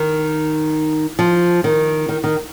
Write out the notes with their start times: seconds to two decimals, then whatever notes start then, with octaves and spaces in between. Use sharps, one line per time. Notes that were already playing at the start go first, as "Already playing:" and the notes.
Already playing: D#3
1.19 F3
1.64 D#3
2.09 D#3
2.24 D#3